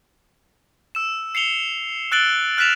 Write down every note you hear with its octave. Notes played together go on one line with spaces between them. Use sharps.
E6 E7
C7 C#7 F7 G7
E6 F#6 A6 D7 F#7 G7
F6 F#6 A6 B6 E7 F7